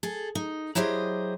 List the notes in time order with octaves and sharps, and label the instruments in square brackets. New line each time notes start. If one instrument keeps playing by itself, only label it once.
[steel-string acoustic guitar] G#4 A4
D#4
F#3 E4 G4 G#4 C5 D#5